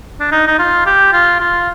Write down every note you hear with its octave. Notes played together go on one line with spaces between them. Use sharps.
D4
D#4
D#4
F4
G4
F4
F4